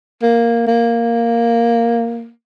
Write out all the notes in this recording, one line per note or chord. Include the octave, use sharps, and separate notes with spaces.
A#3
A#3